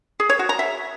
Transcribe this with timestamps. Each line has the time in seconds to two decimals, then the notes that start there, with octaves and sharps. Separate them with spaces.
0.20 G#4
0.29 C#5
0.39 F#4
0.49 A#5
0.59 E5